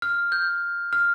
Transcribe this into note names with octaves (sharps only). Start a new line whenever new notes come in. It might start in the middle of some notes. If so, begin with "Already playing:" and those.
F6
G6
F6